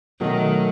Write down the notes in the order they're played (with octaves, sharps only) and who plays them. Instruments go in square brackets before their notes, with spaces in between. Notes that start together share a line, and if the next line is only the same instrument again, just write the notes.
[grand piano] B2 F#3 A3 [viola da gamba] D#3